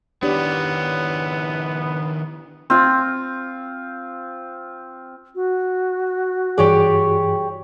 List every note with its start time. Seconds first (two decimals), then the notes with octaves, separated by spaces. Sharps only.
0.23 D#3 B3 D4 E4 G4 C#5 D5
2.70 C4 F4
5.35 F#4
6.58 G2 E3 G4 G#4 C#5 D5